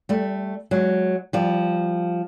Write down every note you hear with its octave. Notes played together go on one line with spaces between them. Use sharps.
G3 A3
F#3 G#3
F3 G3